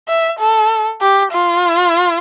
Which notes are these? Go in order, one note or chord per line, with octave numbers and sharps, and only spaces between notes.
E5
A4
G4
F4